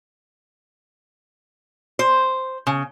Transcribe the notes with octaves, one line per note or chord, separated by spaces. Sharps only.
C5
C#3